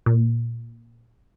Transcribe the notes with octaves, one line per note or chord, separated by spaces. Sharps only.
A#2